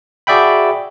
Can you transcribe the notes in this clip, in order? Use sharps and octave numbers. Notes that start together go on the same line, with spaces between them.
F#4 G#4 D5 E5 G5 B5